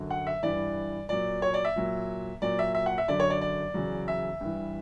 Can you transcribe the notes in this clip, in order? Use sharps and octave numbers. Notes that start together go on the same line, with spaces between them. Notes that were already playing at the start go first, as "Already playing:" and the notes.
Already playing: F#2 D3 F#3
F#5
E5
G2 E3 D5
A#2 F#3 D5
C#5
D5
E5
A#2 F#3
A#2 F#3 D5
E5
E5
F#5
E5
F#2 D3 F#3 D5
C#5
D5
D5
E2 C#3 F#3
E5
G2 E3